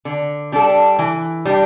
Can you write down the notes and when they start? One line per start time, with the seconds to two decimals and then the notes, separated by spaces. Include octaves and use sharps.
0.05 D3
0.52 G3 D4 A4
0.99 E3
1.45 G3 D4